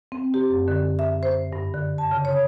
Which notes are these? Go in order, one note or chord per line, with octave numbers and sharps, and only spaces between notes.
C4
G4
F#2
D3
E5
C5
G2
D3
A5
C#3
C#5